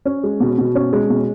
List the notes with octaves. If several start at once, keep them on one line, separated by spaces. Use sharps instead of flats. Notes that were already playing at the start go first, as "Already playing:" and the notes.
C#4
G#3
B2
B2
C#4
G#3
B2